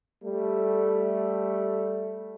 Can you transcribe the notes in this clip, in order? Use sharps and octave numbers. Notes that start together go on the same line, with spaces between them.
G3 A3